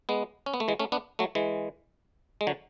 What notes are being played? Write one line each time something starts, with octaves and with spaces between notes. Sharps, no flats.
G#3 B3
C#4
B3
A3
E3 G#3
A3 C#4
B3 D4
F#3 A3
E3 G#3
G#3
D3 F#3